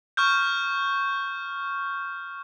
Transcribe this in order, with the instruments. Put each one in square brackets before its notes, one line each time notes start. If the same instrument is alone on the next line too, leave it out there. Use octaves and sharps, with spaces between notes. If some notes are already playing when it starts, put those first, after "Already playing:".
[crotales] C#6 F6 G6